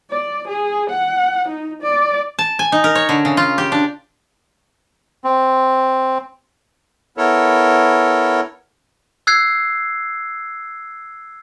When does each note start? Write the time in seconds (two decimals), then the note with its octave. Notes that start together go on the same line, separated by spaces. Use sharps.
0.11 D5
0.48 G#4
0.90 F#5
1.48 D#4
1.83 D5
2.39 A5
2.59 G#5
2.72 D#4
2.84 A#4
2.95 C#5
3.09 D3
3.25 C#3
3.37 F4
3.58 G4
3.72 D4
5.24 C4
7.17 B3 E4 A4 A#4 C#5
9.27 E6 F#6 G#6 C7